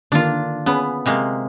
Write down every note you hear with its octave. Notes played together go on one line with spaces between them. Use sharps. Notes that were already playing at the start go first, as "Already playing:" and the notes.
D3 D#3 A#3 D4 F4
B3 C#4 G#4 B4
C3 G#3 A#3